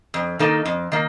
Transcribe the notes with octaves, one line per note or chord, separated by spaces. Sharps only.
F2
D#3 A#3 D#4 A4
F2
D#3 A#3